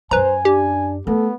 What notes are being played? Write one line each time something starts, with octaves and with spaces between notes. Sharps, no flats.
F#2 C#4 B4 C5 G#5 A#5
D4 G4
A3 B3 A4